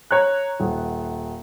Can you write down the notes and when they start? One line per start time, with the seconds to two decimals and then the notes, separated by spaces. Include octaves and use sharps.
0.11 C#5 A#5 F#6
0.60 D#1